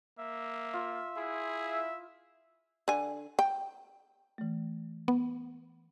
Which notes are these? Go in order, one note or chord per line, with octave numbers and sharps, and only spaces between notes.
A#3 E5
F4
E4 G#4
E5
D3 G#5
G5
E3 A3
B3